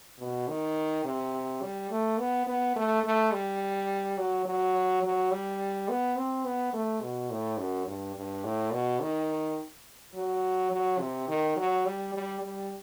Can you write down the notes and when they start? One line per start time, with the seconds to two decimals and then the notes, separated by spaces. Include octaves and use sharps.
0.19 B2
0.48 D#3
1.05 C3
1.62 G3
1.90 A3
2.18 B3
2.47 B3
2.76 A3
3.04 A3
3.32 G3
4.18 F#3
4.45 F#3
5.03 F#3
5.31 G3
5.89 B3
6.16 C4
6.45 B3
6.73 A3
7.02 B2
7.30 A2
7.59 F#2
7.87 G2
8.15 G2
8.44 A2
8.72 B2
9.00 D#3
10.14 F#3
10.71 F#3
11.00 C3
11.28 D#3
11.56 F#3
11.85 G3
12.14 G3
12.42 G3